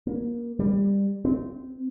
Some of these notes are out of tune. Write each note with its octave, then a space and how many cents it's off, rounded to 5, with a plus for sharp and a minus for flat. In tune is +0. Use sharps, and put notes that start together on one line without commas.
A#3 +25
G3 +20
C4 -20